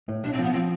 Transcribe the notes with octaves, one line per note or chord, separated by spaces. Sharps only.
A2
B1 D4
C4
F3 B3
F3 C4